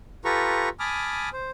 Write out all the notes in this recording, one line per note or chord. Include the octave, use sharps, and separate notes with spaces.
F4 G4 A4 B4 A#5 C#6
G#5 A5 B5 D6 D#6 F6
C5